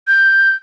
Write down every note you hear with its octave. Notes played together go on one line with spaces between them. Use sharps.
G6